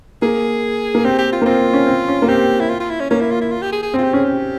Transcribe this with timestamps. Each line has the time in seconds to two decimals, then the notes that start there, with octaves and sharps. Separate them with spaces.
0.22 A#3 G#4
0.95 A#3
1.05 C4 G4
1.19 G4
1.32 F4
1.42 A#3
1.46 C4 F4
1.73 C#4
1.86 C4
2.08 C#4
2.22 A#3
2.28 C4 G4
2.60 E4
2.69 F4
2.80 F4
2.90 E4
3.00 C#4
3.10 A#3 C#4
3.21 E4
3.31 F4
3.41 E4
3.51 F4
3.62 G4
3.73 G#4
3.83 G#4
3.94 C4
3.98 F4
4.03 G4
4.13 C#4 G#4
4.24 G4